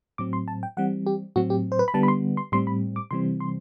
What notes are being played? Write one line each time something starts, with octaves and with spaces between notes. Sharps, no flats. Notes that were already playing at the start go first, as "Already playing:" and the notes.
A2 F#3 C4 D6
C6
A5
G5
E3 G3 C4 F#5
G4
A2 F#3 C4 F#4
G4
C5
B4
B5
D3 G3 B3 A5
B5
C6
C6
A2 G3 C4 C6
B5
D6
C3 E3 G3 C4 C6
C6